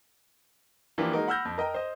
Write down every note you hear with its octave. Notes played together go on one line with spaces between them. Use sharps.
E3 F3 A#3 D4 F4 G4
G#3 A#3 D#4 F#4 A#4
F#5 B5 E6 F6 G6 A#6
F2
A#4 D#5 G5 A#5
C5 D#5